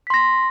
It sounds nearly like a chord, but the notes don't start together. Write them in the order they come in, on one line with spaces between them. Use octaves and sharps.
B6 C6 A#6